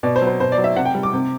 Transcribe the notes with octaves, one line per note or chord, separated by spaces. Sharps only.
B2 D5
C5
F#3
C5
B2 C5
D5
F#3
E5
C3 F#5
G5
G3
D6
C3